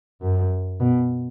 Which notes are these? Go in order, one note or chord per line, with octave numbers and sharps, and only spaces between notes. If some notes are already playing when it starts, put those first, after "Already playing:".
F#2
B2